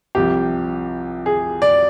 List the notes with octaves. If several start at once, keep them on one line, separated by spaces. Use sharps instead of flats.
C2 C3 F3 G4
G#4
D5